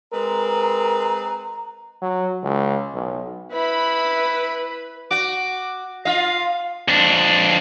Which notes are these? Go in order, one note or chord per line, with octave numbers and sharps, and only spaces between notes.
G#3 C4 A#4 B4 A#5
F#3
C#2
B1
E4 B4 B5
F#4 D6
F4 D#5 F5
F2 D4